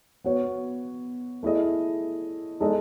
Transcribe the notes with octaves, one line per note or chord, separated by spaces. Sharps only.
B3 F#4 C#5
A3 E4 G#4 D#5
G#3 D#4 A4 D#5